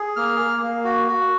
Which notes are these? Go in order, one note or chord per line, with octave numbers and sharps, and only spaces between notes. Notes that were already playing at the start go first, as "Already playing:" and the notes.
Already playing: G#4
A#3 F6
A#3
A#3
F#4
F#4